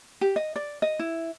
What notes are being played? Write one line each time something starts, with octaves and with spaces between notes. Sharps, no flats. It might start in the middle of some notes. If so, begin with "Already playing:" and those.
G4
D#5
D5
D#5
E4